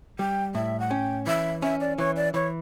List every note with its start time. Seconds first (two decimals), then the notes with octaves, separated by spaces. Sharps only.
0.19 G3 G5
0.55 A2 E5
0.80 F#5
0.91 C#4 G5
1.27 E3 E5
1.62 C#4 E5
1.81 D5
1.98 E3 C#5
2.16 D5
2.34 E3 C#5